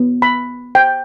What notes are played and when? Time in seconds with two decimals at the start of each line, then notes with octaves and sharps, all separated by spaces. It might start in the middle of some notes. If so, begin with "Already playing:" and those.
Already playing: B3
0.22 B5
0.75 G5